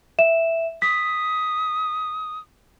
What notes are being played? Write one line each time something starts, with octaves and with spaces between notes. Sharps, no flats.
E5 E7
D#6 B6